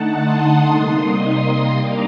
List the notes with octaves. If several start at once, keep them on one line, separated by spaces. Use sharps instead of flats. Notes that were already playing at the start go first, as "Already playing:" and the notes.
Already playing: D3 A3 D#4 F#5 A5
C6 D#6
C3 G3 A#3 D#4 C6 D#6
G3 A#3 D4 A#5 D6